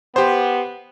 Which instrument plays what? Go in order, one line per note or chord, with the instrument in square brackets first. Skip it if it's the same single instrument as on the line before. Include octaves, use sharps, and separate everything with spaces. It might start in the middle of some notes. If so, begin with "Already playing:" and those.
[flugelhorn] B3 [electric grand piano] G4 C5